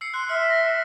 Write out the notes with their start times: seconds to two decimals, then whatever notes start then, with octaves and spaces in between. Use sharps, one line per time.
0.01 E6 C7 C#7
0.14 C6 F#6
0.29 E5 E6 F6
0.50 A#6